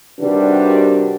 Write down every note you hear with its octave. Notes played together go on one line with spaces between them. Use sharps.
C3 D#3 G3 D4 F#4 B4